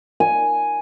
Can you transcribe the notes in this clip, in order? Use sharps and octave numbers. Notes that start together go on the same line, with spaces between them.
G#5